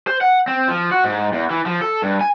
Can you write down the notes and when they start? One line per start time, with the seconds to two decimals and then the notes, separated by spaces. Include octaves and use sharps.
0.08 C5
0.21 F#5
0.47 C4
0.68 F3
0.91 F#4
1.04 G#2
1.33 E2
1.50 E3
1.66 F3
1.81 A4
2.03 G2
2.21 G#5